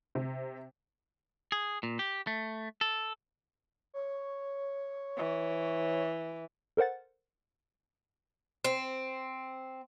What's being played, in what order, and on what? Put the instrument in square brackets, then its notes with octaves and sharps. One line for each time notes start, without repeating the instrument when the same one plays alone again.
[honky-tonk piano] C3
[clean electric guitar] G#4
A#2
G4
A3
A4
[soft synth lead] C#5
[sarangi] E3
[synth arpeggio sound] A4 A#4 C5 F#5 A6
[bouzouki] C4